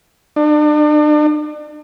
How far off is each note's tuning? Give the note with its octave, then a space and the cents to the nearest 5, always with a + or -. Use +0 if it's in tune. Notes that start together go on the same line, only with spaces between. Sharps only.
D4 +40